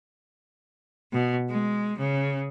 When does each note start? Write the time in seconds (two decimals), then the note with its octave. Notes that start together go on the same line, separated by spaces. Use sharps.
1.12 B2
1.48 G#3
1.99 C#3